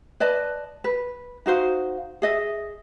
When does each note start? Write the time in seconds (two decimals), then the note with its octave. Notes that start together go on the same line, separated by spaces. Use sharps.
0.20 B4 D5 D#5 A5
0.84 B4
1.46 D#4 F#4 C5 F5
2.22 G#4 D#5 E5